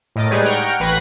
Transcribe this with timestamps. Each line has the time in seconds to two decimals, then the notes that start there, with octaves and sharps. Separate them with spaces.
0.16 A2 A#4 D#5 A6 D7
0.30 G3 G#3 D#4 G#4 B4 C#5
0.45 F#5 G5 A#5 C#6 F6
0.80 A1 B4 B5 G#6 A#6 C7